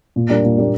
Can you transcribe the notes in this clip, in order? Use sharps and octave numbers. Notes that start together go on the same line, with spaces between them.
A#2
G3 A#3 D4
A#2
G3 A#3 D4